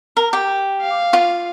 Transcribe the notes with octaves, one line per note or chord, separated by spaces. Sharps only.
A#4
G4
F5
F4